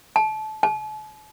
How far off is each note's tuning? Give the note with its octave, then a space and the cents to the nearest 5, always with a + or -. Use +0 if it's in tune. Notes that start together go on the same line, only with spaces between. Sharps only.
A5 -25
A5 -45